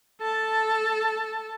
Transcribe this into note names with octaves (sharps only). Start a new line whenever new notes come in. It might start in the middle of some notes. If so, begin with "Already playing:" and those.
A4 A5